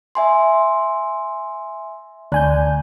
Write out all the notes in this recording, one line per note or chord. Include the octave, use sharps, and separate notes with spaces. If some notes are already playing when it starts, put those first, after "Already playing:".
E5 G#5 C6
D2 D5 G#5 F#6 G6